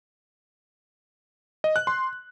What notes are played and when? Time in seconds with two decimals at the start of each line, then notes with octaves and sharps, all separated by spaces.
1.64 D#5
1.76 F#6
1.87 C6